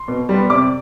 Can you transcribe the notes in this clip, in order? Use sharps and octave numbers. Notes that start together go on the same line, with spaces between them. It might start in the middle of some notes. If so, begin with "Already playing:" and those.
Already playing: C6
B2
G3 B3
C3 D5 D6